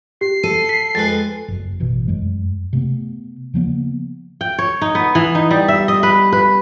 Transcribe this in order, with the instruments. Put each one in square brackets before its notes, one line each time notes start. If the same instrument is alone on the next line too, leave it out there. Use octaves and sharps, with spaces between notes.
[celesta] G4 [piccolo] C7
[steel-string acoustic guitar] A4 [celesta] D#7
[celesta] B6
[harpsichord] F2 G#3 B4 [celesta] A6
[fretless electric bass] F#1 F#2
A1 B2 E3
F1 F#2 F#3 G#3
C3 A3 B3
C#3 F3 A#3 B3
[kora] G5
C#5
D#4
B3
E3
D#4
G3
E5
D#5
B4
B4